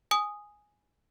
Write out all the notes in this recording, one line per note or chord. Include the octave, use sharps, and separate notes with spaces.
G#5 D#6